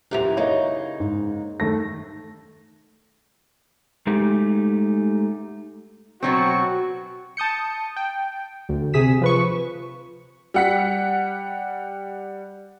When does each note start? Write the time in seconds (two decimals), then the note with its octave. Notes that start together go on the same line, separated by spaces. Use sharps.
0.11 F#2 A#2 E3 G4 F7
0.37 C#3 A#3 D#4 C#5 D#5
1.00 G#2
1.60 D#3 A3 A#6
4.07 G#3 A3 D#4 G4
6.23 B2 F#3 C4 F#4 C#6
7.37 A5 D#6 G6 C#7
7.96 G5
8.69 D2
8.93 C3 G#4 D#6 B6 E7
9.21 F3 B4 C#6
10.54 G3 F#5 B6